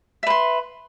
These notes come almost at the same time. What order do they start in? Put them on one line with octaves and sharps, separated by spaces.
E5 B4 C6